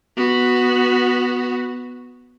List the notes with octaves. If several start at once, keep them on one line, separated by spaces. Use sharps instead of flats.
B3 F#4